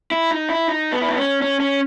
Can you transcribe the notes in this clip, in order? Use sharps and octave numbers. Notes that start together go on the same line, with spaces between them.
E4
D#4
E4
D#4
B3
E4
D#4
C#4
C#4
C#4